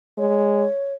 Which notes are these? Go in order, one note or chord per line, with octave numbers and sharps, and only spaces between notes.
G#3 C#5